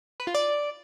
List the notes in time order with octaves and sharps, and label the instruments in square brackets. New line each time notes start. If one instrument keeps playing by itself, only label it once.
[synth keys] B4
F4
D5